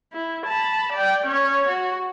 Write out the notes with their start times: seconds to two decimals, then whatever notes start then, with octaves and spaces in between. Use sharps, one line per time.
0.13 E4
0.46 A5 B5
0.93 D5 G5
1.27 C#4 C#5
1.69 F#4